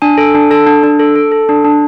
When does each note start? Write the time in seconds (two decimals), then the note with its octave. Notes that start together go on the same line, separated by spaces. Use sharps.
0.02 D4 G#5
0.18 A4
0.35 D4
0.51 A4 A5
0.67 D4
0.84 D4
1.00 A4
1.16 A4
1.32 A4
1.49 D4
1.65 D4